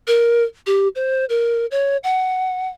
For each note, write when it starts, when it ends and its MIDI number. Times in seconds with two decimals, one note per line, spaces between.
0.07 0.44 70
0.67 0.88 67
0.95 1.25 72
1.29 1.66 70
1.71 1.97 73
2.04 2.68 78